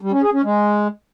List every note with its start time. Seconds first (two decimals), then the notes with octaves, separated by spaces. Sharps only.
0.01 G3
0.12 C#4
0.23 G#4
0.33 C#4
0.44 G#3